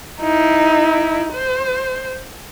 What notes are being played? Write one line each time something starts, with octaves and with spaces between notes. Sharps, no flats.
D#4 E4
C5